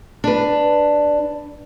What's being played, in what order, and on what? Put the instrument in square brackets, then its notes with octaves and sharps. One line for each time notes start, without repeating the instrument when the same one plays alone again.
[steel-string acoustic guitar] D4 B4